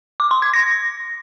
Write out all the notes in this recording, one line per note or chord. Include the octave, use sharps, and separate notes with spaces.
D6
C6
G#6
A#6